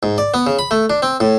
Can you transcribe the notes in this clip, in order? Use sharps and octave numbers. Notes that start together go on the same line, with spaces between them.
G#2
D5
B3
C#3
B5
A3
D4
C4
A2